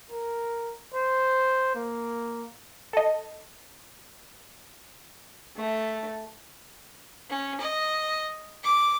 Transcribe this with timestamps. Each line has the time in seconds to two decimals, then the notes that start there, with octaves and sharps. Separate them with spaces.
0.11 A#4
0.94 C5
1.75 A#3
2.93 A4 D#5
5.57 A3
7.30 C#4
7.60 D#5
8.64 D6